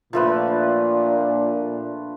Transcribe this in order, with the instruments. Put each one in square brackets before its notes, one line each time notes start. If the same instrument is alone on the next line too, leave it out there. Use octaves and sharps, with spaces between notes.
[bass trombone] A#2 [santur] F3 A3 B4 [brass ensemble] D4